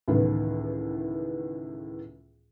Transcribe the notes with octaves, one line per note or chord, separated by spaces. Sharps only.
C#2 A2 D#3 E3 B3